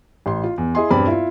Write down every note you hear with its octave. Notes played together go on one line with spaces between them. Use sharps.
A1 C6
F4
E2
E4 G#4 D#5 G#5 C6
E1 G2 C4 D5 B5
E4 F4